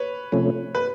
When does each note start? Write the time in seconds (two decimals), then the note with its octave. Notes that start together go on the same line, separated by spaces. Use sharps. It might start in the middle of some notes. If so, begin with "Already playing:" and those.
Already playing: B4 C#5
0.32 C3 F3 A3 C#4
0.75 B4